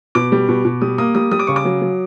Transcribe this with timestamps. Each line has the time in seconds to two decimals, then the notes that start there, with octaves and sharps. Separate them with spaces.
0.15 B2 D6
0.32 G3
0.49 B2
0.65 B2
0.81 G3 D#6
0.98 A#3 D#6
1.15 G3 D#6
1.31 G3 D#6
1.39 D6
1.47 C#3 C#6
1.56 D6
1.65 F#3
1.82 F#3